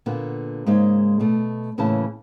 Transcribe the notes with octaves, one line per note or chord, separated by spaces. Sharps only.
A#2 D3 A#3 B3
G#2 C#3 G#3 A#3 D#4
B2 A3
A2 C#3 E3 A#3 A5